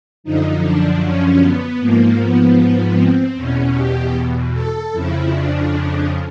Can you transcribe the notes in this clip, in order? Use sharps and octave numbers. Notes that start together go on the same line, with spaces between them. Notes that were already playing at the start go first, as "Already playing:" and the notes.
F#2 D3 F3 D#4
D4
C#4
B3
G#2 F3 A#3
B3
C4
E2 B2 C#4
G4
A4
F2 C#3 F3 E4
D4